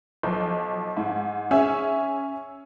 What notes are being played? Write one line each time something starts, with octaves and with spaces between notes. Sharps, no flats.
B1 F3
G#2
C#4 G#4 E5